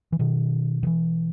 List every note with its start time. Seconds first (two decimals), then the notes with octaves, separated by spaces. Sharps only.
0.12 E3
0.19 B2 D#3
0.83 D#3
0.87 E3